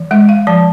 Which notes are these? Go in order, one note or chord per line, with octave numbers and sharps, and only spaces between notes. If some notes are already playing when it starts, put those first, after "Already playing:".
Already playing: E3
G#3 E5
F5
F3 A5